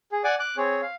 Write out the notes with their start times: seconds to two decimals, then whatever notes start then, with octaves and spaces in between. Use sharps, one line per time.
0.12 G#4
0.24 D5 F#5 G#5 D6
0.39 D6 F#6
0.57 C4 G#4 C#5
0.82 F5